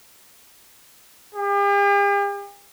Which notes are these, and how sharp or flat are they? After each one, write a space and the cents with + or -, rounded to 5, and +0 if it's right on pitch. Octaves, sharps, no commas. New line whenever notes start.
G4 +45